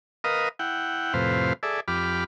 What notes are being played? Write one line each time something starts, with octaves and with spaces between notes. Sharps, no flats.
A#4 B4 D#5 F5 D#6
E4 F#5 G5
F2 A2 C3 B4 C5 F5
G#4 A4 D5 E5
F2 G4 B5 D6 F6